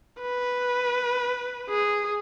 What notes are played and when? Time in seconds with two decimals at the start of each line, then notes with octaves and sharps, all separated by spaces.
0.22 B4
1.70 G#4